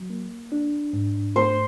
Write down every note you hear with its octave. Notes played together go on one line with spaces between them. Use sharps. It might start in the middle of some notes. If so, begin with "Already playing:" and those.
Already playing: F#3
A#3
D4
G#2
A3 C5